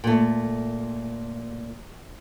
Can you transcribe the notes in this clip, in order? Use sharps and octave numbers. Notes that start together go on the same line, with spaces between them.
A#2 A3